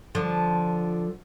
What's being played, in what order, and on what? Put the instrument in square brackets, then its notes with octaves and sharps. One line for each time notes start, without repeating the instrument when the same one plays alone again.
[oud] D3 F3